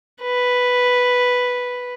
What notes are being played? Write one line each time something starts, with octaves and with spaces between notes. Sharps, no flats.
B4